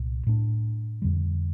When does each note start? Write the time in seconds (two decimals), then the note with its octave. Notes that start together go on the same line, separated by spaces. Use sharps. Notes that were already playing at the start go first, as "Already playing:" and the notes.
Already playing: C2 A#2
0.27 A2 A3 D4
1.02 F2 D3 G3